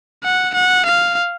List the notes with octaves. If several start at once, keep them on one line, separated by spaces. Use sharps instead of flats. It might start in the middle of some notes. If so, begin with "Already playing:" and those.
F#5
F#5
F5